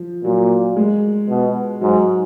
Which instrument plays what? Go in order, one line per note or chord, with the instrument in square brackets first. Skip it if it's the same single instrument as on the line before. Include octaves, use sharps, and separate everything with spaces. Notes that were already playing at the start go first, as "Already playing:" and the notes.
Already playing: [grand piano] F3
[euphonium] A#2 [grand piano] F#3
[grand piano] G#3
[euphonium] B2
[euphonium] G#2 [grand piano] F#3